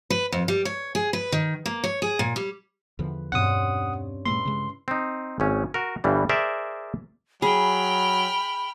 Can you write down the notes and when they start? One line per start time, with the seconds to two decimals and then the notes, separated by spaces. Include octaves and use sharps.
0.10 B4
0.32 F2
0.48 G3
0.65 C#5
0.95 G#4
1.13 B4
1.32 D#3
1.66 A#3
1.84 C#5
2.02 G#4
2.19 A#2
2.36 G3
2.99 E2 D3 F3 B4
3.32 E2 G2 B2 E3 C4 C#4 F#5 D#6
4.26 A#2 G#3 A#3 E4 B4 C6
4.45 C#3 G#3
4.88 C4 D#4
5.40 G#1 C#4
5.74 F#4 A#4
6.04 G1 G2 E3 G3
6.29 G#4 A#4 C5 D5 E5
7.42 F#3 G#4 G5 B5 F6